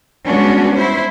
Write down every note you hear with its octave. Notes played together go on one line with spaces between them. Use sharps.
G3 G#3 B3 C#4 D4 F#4
E4 C5